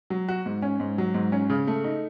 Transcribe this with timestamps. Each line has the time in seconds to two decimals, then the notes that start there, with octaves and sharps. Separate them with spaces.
0.10 F#3
0.28 F#4
0.46 G#2
0.62 C#4
0.80 G#2
0.98 F#3
1.14 G#2
1.32 C#4
1.50 C#3
1.67 A3
1.84 D#4